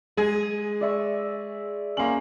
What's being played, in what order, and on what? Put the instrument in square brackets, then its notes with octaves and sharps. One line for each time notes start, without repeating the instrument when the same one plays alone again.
[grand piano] G#3 [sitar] G#4
[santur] D5 E5 C#6
[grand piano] A#3 F#7 [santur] C#4 C5